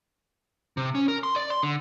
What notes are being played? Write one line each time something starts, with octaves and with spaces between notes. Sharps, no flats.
C3
C#4
A#4
C6
D5
C6
D3